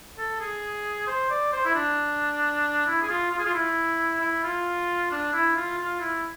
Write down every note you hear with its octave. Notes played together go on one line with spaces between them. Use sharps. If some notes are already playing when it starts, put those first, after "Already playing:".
A4
G#4
C5
D5
C5
E4
D4
E4
G#4
F4
F4
G#4
F4
E4
E4
F4
D4
E4
F4
F4
E4